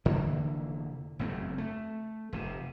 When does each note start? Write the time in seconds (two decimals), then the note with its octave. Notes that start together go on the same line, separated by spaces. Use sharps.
0.05 F1 D3 E3 A#3
1.19 F#1 E2 A3 C4
1.58 A3
2.33 F1 C3